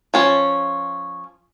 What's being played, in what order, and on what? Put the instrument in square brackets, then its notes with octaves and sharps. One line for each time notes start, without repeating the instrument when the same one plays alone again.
[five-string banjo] F3 C#4